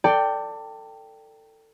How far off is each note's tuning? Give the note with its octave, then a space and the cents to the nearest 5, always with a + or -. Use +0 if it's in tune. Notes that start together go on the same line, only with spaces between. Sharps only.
A4 +25 D5 +0 G5 +0